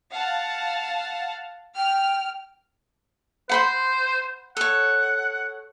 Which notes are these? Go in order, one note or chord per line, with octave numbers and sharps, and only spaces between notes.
F5 F#5 A5
G5 F6
C5 F#5 B5 C6
A4 C#5 F#5